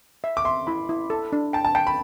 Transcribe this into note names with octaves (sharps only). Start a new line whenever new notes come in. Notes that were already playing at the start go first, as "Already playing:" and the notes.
E5
D6
E5 C6
E4 B5
E4
A4
D4
G5 A5
A5
G5 A5
B5